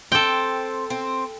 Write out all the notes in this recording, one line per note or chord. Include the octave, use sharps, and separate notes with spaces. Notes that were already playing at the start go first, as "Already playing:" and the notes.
C4 A4 G5
C4